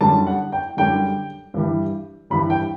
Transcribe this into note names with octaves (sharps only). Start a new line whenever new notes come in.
F#2 D3 G3 A5
F#5
G5
F#2 D3 G3 G5
G2 E3 G3
G2 E3 G3 B5
G5